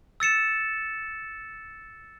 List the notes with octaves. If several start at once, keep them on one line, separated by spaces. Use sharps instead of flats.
E6 A6 C#7 E7